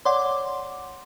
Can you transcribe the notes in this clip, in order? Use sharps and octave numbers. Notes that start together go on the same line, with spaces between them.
C#5 D5 F#5 C6 D6